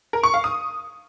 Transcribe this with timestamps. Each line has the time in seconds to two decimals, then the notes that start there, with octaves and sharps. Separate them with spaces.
0.13 A#4
0.23 C#6
0.34 F5
0.44 D#6